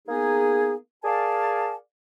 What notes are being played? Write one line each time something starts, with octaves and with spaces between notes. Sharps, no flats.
A#3 B3 D#4 G#4
G#4 A#4 D5 F5 G#5 A5